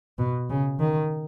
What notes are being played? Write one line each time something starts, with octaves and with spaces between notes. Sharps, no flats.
B2
C#3
D#3